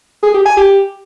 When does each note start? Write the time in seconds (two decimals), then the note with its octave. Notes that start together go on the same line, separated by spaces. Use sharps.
0.23 G#4
0.34 G4
0.46 G#5
0.57 G4